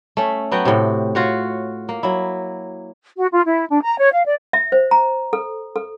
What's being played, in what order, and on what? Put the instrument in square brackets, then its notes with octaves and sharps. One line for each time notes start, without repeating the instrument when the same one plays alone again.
[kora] A3 C#4
F#3 B3 F#4 G5
A2 C3
F4 F#4 C#5
A#3
F#3 E4
[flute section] F#4
F4
E4
D4
A#5
C#5
F5
D5
[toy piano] E5
C5
A#5
A4
A4